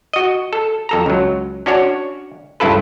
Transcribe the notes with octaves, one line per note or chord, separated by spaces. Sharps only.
F#4 D#5
A4
F2 A4 A#5
C#2 F#3
C#4 D4 F#4 C#5 D5
C#2 G2 E4 F4 A4 B4